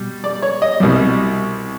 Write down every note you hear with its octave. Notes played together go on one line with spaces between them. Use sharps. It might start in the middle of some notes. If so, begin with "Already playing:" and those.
Already playing: B2 G3
D5
C#5
D#5
C2 B2 G3